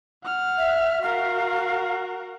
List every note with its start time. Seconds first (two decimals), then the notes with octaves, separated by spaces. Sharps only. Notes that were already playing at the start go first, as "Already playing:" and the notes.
0.25 F#5 F6
0.58 E5
1.02 F#4 A#4 F5